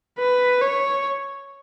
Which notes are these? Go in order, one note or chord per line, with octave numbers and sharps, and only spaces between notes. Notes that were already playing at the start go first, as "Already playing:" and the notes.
B4
C#5